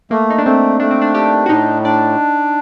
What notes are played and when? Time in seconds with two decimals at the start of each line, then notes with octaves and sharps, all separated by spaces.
0.11 A3 A#3
0.30 D#4
0.38 D4
0.45 A3 C4
0.80 A3 D4
0.91 C4
1.02 D4
1.14 D4 G4
1.46 F#4
1.49 A2 D#4
1.85 D4 D5